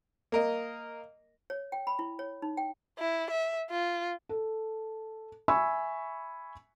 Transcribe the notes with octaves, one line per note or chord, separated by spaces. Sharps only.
A#3 A#4 D#5
C#5
G5
B5
E4
C#5
D#4
G5
E4
E5
F4
A4
E5 G#5 B5 C#6 E6